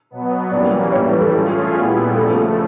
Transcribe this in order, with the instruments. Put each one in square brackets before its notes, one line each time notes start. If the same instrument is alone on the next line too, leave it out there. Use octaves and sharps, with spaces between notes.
[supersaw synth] B2 F#3 B3
[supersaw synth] E3 G3 A#3 C#4 [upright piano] D5
[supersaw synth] A2 E3 G3 [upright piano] C#5
[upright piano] B4
A4
[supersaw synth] A3 C#4 F4 G#4
A#2 G3 B3 E4
[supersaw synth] C#3 F3 A3 [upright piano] A4